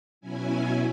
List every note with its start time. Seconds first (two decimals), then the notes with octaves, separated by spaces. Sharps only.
0.21 B2 F#3 C#4 E4 G#5